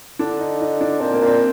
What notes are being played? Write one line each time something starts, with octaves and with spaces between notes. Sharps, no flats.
D3 D4
D#4
D#4
D4
A#2 C4
A#3
A#2
C4